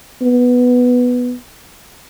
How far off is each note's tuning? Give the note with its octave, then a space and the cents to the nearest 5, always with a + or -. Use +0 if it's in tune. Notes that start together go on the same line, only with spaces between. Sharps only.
B3 +0